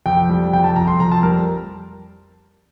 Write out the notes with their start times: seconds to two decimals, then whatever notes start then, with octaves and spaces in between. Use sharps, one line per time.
0.06 F2 G5
0.29 G3
0.53 F2 G5
0.64 A5
0.76 F2 A#5
0.88 C6
1.00 F2 A#5
1.12 A5
1.23 G3 A#4